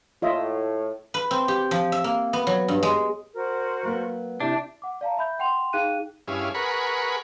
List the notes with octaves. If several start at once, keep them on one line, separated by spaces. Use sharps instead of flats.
A2 F4 D#5 E5
B4
C4
G4
F3
E5
A#3
B3
F#3
G2
G#3
F#4 A#4 C5
F#3 A#3 B3
C3 D4 E4 G4 A5
F#5 D6
D5 F5 A5 A#5
E5 B5 G6
F#5 G5 C6 F7
D#4 G#4 F5 G5 F#6 D#7
G2 C#4 E4 G#4 F5
G#4 A#4 B4 F#5 B5 C#6